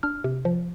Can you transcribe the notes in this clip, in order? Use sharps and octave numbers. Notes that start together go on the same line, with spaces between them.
D4 F6
C3
F3